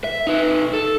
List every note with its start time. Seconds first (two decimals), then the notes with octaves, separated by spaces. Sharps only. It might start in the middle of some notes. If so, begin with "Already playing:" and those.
0.04 E5
0.27 D#4 B4
0.73 A4